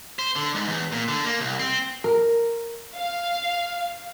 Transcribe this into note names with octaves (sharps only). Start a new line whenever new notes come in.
C5
D3
G#2
E2
A#2
D3
A#3
C2
C4
A#4
F5